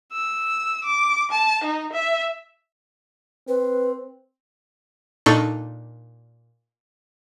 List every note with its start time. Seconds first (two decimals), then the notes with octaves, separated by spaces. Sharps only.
0.12 E6
0.84 D6
1.31 A5
1.64 D#4
1.93 E5
3.48 C4 B4
5.26 A#2 D4 D#4 A4 C#6